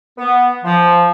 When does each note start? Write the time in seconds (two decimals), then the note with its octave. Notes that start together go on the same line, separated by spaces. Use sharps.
0.18 B3
0.65 F3